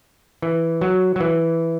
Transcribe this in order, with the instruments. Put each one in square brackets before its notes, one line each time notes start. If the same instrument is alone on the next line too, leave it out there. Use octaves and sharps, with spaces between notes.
[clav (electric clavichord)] E3
F#3
F#3
E3